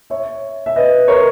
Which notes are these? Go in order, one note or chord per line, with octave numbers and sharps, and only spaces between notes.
C#5 E5
E5
B4 D#5
A#4 C#5